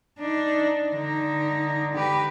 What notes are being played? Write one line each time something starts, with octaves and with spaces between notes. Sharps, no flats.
D4 D#4
D3 D#4
G4 B4